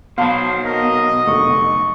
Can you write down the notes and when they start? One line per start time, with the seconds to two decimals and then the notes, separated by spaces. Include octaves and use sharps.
0.18 B2 F#3 C5 F5 A5 B5
0.65 A#4 D#5
1.27 F1 D3 C#6